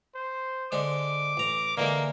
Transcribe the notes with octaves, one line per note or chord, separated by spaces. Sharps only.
C5
D3 G#3 C5 D6
A1 A#5
D3 E3 G#3 A#3